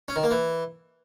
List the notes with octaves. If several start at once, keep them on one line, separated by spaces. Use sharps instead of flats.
C#4
D#3
A#3
E3